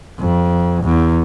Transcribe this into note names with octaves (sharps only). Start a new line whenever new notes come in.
F2
E2